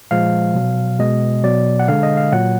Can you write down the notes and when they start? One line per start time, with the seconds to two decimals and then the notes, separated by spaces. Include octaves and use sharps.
0.11 A#2 F3 G#3 F5
0.55 B2 F#3
0.99 B2 G#3 D#5
1.43 B2 F#3 D5
1.79 F#5
1.88 D3 G#3 F5
2.03 D#5
2.17 F5
2.32 A#2 F#3 F#5